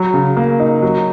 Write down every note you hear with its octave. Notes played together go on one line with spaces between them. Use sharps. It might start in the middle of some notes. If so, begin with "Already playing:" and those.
Already playing: F#3
C#3
A#3
D#4
F#3